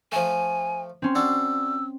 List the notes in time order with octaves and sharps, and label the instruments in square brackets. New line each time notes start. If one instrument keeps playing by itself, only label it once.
[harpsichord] F3 A3 [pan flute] G#5
[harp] C4 C#4 C6
[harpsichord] D4 F#4 [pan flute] E6